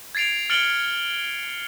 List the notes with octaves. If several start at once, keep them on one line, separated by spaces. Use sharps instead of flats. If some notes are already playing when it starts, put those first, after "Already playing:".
G#6 A6 C7 D7 F7
F6 A6 C#7 D7 F#7 G7